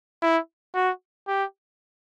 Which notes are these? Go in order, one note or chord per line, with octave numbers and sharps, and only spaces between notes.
E4
F#4
G4